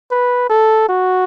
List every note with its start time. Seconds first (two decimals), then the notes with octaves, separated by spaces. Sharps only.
0.11 B4
0.50 A4
0.89 F#4